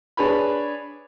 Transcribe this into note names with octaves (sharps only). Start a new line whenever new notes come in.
D4 G#4 B4 C#5 B5